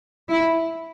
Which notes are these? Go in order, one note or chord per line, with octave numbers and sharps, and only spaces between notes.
E4